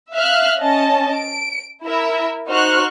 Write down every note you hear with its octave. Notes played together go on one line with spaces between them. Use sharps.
E5 F5 F6 F#6
C#4 D#5 A5
D7
E4 A#4 E5
D#4 F#4 C5 C#6 F6 F#6